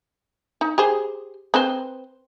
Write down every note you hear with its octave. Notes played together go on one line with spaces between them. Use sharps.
D#4
G4 G#4 C5
C4 B4 C5